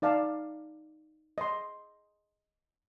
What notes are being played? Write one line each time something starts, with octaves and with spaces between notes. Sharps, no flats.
D#4 D5 F5 A5
D#5 C6